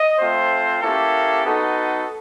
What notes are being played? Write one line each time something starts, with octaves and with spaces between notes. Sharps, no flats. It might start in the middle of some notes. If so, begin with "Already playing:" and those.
Already playing: D#5
A3 C4 F4 C5
A#3 C#4 E4 G4 A4
B3 D#4 F#4 A4